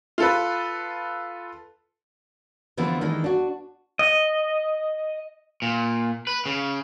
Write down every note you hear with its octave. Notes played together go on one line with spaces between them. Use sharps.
F4 A4 B4
D3 E3 F3 A3 B3 C4
D#3 E3 G#3 D4
D4 F#4
D#5
A#2
B4
C#3